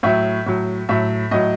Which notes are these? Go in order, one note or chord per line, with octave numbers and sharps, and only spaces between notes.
A2 F#3 E5
A2 F#3
A2 F#3 E5
A2 F#3 D#5